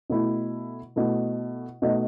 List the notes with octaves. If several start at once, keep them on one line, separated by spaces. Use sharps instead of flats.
B2 A3 E4
B2 A3 E4
B2 A3 D#4